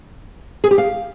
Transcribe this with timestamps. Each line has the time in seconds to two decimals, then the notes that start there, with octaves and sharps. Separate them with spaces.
0.64 G#4
0.71 G4
0.78 F5